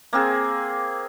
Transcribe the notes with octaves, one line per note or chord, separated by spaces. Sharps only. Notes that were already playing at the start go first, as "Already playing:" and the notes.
A#3 C4 G#4